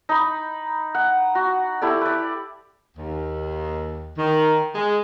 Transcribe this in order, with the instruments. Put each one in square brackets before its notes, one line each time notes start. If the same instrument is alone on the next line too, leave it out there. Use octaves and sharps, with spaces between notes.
[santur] D#4 B5
F#5
F#4
E4 G4 A4 D5
B4 D5
[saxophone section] D#2
D#3
G#3